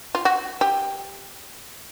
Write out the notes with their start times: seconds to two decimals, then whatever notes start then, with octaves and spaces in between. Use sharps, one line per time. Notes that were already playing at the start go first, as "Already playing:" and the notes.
0.15 F4
0.25 F#4
0.61 G4